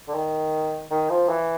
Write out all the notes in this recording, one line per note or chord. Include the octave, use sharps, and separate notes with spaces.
D3
D#3
D#3
F3
E3